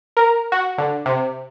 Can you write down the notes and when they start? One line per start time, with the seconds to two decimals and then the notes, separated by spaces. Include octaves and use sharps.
0.17 A#4
0.52 F#4
0.78 D3
1.06 C3